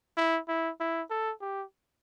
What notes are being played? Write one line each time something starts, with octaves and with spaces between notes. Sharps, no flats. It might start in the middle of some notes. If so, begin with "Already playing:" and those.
E4
E4
E4
A4
G4